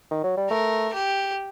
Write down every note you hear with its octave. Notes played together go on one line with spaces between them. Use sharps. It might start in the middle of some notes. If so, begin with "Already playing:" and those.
D#3
F#3
G3
A3 A#4
G4